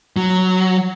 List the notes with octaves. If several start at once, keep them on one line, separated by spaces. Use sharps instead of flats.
F#3